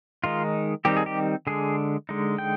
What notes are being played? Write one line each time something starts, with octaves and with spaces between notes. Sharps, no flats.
D#3 G#3 D#4 F4
D#3 G3 C4 D#4 G4
G#4
G4
D3 G#3 D4 G#4
D3 G#3 D#4
G5